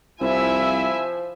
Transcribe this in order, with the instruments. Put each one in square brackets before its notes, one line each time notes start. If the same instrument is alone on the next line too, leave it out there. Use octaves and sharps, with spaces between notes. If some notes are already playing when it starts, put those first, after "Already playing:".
[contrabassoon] C2 [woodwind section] F3 [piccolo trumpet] E4 [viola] E5 G#5